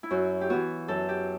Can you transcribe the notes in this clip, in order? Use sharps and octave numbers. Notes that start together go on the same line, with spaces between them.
E4
F#2 F#4
G4
E3 B3 F#4
F#2 A4
G4